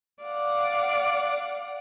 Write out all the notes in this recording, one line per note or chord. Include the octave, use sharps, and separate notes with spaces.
D5 F5 F#5